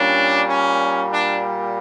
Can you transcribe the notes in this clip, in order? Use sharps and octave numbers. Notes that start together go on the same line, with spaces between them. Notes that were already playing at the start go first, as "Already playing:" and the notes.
Already playing: A#2 G3 A#3 C#4 D4
C#4
D4